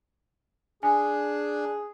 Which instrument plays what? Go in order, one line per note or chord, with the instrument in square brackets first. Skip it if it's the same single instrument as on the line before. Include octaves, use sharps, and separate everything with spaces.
[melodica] D4 [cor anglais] G#4 [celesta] G#5